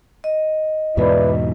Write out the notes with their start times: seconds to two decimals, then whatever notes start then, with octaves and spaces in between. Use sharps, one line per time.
0.24 D#5
0.97 E2 G#2 B2 E4 B4 D5